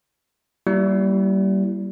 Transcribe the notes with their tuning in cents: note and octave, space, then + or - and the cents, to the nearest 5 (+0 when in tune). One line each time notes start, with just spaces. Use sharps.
G3 -25 A#3 +5 E4 +10